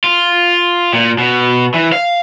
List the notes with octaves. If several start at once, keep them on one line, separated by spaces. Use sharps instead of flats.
F4
A#2
B2
E3
F5